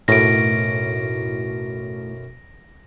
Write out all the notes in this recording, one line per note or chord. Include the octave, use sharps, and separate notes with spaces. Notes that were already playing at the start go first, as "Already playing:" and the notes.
B1 F#2 A2 C#4 A#6 D7